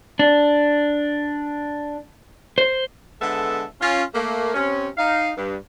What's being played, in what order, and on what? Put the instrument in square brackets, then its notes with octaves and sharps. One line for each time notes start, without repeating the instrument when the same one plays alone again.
[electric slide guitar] D4
C5
[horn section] D3 G#3 B3 A4 E5
C#4 F4
A3 A#3
C3 C4 C#4
D#4 F5
G2